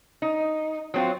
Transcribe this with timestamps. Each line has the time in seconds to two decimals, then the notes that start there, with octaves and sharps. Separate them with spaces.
0.22 D#4
0.94 F#3 C4 F4